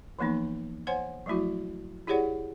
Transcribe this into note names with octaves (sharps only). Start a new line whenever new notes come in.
E3 F3 A#3 B3 D#4
C5 C#5 F#5 G#5 C6
F3 F#3 A3 E4 F#4
E4 G4 G#4 C#5 D5 F#5